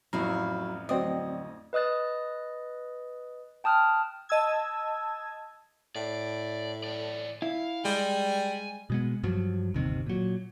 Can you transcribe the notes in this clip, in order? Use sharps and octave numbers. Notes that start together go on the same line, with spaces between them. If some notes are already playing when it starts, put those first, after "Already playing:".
A1 F2 F#3 E4 F5 A#5 B5
D2 F#3 C4 D5 D#5
B4 D#5 D#6 F#6 A6
G5 A5 D#6 F6 F#6
D#5 A5 E6 G#6
A2 D5
E3 D5
E4 F5
G3 G#3 G#5
B2 G#3 B3
G2 F3 F#3
G1 D#2 C3 D#3
A#2 F#3